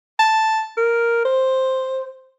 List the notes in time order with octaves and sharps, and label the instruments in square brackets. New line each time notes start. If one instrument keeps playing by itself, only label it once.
[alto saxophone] A5
A#4
C5